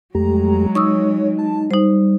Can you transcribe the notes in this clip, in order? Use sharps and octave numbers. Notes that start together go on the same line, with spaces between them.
F2 F#3 G#3 A3 G4 A#5
D#4 C#5 C#6 D#6 E6
A5
G3 D#4 C5